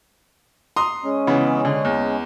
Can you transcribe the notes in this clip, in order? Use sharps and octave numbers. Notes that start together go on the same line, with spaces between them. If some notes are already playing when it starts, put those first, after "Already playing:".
A#5 C6 D#6
G#3 C#4
C#3 E3 B3
D3 G#4
E2